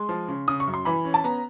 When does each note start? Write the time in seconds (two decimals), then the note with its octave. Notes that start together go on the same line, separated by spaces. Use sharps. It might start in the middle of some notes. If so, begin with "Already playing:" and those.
Already playing: G#3 C6
0.09 F3
0.28 C#3
0.48 C#3 D#6
0.60 C#6
0.67 F#2
0.74 C6
0.85 E3 B5
1.05 C#4
1.14 A5
1.24 B3 A#5